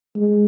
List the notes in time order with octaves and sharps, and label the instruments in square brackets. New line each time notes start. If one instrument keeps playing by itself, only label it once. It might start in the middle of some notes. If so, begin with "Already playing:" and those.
[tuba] G#3